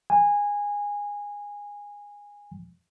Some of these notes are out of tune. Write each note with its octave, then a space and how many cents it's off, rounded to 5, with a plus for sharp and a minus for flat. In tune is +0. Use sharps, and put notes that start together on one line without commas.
G#5 -20